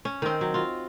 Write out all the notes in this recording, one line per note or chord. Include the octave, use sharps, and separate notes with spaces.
C#4
D#3 C4
F#3
F4 F#4